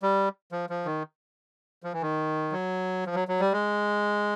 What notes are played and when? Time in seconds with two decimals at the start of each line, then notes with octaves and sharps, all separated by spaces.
0.03 G3
0.52 F3
0.70 F3
0.85 D#3
1.83 F3
1.93 E3
2.02 D#3
2.52 F#3
3.06 F3
3.15 F#3
3.28 F#3
3.40 G3
3.52 G#3